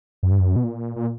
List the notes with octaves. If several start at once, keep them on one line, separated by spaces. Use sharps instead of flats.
F#2
G2
F#2
B2
A#2
A#2